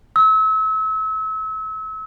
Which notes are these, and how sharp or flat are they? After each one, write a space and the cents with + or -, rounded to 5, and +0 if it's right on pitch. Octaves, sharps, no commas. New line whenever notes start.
E6 -35